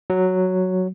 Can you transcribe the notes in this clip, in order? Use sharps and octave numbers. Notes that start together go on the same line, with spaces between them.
F#3